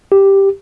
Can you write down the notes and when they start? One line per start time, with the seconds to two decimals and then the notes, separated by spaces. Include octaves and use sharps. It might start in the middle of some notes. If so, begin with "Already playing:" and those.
0.12 G4